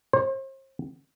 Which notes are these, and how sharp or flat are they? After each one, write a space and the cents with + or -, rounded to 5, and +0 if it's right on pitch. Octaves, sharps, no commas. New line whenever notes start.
C5 +40